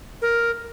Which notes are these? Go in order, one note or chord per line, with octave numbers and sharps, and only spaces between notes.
A#4